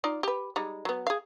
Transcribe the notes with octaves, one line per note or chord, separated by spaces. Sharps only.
D#4 F4 D5
G4 B4
G3 G#3 D#4
F#3 B3
G#4 F5